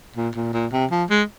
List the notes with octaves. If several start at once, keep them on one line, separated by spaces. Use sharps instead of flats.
A#2
A#2
A#2
C3
F3
G#3